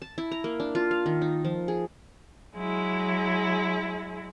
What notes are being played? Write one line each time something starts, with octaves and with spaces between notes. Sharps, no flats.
A5
E4
A#5
A#3
D4
F4
F5
D#3
D#4
F3
G#4
F#3 G#3 E4